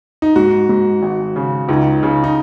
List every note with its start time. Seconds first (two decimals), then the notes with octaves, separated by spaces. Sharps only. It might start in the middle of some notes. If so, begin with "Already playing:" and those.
0.22 D#4
0.36 G#2 F#4
0.69 G#2
1.02 G#1
1.36 C#3
1.69 C#2 D#4
2.03 C#3
2.24 D#4